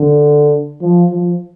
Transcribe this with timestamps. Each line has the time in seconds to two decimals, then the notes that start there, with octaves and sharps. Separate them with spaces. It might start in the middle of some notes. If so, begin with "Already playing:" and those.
Already playing: D3
0.82 F3
1.11 F3